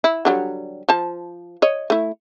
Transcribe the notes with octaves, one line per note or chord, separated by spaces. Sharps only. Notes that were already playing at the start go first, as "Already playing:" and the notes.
E4
D3 F#3 G3
F3 C5 A5
C#5 D#5
A3 E4